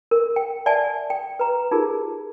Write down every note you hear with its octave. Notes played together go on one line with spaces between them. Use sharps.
A#4
G5
D5 E5 F#5 G#5 A5
G5
B4 A#5
D#4 F4 G4 G#4 A#4